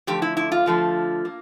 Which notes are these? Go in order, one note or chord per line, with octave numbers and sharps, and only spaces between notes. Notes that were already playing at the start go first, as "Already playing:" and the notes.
D3 F3 A3 G4
E4
E4
F4
D3 F3 A3
A#3